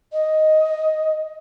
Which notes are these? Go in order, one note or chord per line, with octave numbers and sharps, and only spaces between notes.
D#5